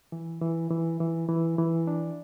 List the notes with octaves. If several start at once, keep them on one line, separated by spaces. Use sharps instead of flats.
E3
E3
E3
E3
E3
E3
D4